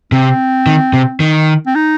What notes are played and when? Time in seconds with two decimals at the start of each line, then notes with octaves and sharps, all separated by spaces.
0.12 C3 C4
0.66 D#3
0.93 C3
1.20 D#3
1.66 C4
1.75 D#4